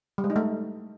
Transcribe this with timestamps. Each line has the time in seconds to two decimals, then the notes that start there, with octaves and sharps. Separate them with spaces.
0.18 G3
0.24 G#3
0.30 D#4
0.36 A3